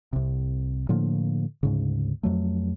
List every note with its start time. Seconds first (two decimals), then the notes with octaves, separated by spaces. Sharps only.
0.13 C2 C3
0.89 A2 D3 F3 A#3
1.63 D2 G#2 C#3
2.23 F2 F#3 A3